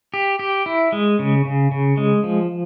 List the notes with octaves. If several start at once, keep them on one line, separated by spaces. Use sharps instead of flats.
G4
G4
E4
G#3
C#3
C#3
C#3
G#3
F3